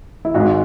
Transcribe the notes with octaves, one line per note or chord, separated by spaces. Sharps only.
E4
G#1 G#2 G#3 F#4